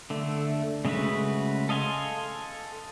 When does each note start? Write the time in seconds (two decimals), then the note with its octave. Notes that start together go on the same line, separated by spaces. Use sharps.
0.10 D3 A3
0.85 C#3 G#3 A3 F#4 B4
1.69 A4 D#5 F5 G#5 C6